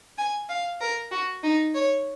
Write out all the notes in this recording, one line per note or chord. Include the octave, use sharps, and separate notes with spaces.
G#5
F5
A#4
F#4
D#4
C#5